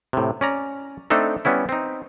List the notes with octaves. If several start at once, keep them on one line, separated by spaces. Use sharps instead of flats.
A2 C3
C#4 D5 A#5
A3 C4 D4 D#4 A4
G3 B3 C#4 E4
C4 D#4